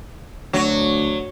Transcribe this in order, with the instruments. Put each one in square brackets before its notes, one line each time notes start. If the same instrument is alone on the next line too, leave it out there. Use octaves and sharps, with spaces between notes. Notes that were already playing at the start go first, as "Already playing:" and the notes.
[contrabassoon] D2 [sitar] F#3